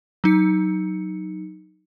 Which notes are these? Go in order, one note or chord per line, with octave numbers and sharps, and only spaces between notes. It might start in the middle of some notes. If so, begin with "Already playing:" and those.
F#3 D#4 C#7